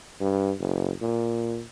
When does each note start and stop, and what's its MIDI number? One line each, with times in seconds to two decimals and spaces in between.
0.21 0.52 43
0.60 0.92 30
1.02 1.62 46